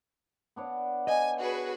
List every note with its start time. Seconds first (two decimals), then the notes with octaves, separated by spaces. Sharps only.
0.56 B3 D4 C#5
1.07 D#5 G#5
1.38 F#4 G#4 B4